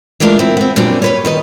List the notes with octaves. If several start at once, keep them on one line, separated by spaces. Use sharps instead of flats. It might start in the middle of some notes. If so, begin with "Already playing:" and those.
E3 G#3 A3 D4 F4 A#4
C4 E4
B3 C4
F#2 A#2 G3 B3 C4 D4
C#4 B4 C#5
D#3 B4 D#5